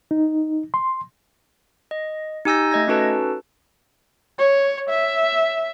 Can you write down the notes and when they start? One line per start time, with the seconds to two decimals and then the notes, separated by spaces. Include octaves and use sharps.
0.11 D#4
0.74 C6
1.91 D#5
2.45 D#4 G4 G#5 E6 G6 A#6
2.71 A3 D#5 G#6 A#6
2.88 C#4 D#4 F#4 A4 B4 A5
4.38 C#5
4.89 E5